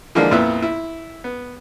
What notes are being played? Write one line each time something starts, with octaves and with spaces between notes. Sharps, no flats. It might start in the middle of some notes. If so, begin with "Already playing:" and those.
D3 E3 F3 G#3 A#3 D4
F2 A#2 B3 E4 E5 F#6
E4
B3